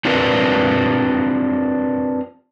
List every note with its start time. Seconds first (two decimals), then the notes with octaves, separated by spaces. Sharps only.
0.05 C4 D4 F4 G4 A#4 B4